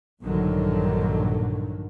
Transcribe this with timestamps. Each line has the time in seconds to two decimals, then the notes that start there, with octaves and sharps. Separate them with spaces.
0.22 A#1 G2 A#2 D3 D#3 F#3